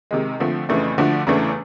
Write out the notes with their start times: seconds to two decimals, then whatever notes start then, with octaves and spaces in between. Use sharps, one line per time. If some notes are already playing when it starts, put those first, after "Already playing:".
0.11 C3 D#3 G#3
0.40 D3 F3 A3 C4
0.69 F2 C#3 E3 A3 D4
0.98 D3 F3 A3 D4 F#4
1.27 E2 C#3 E3 A3 D4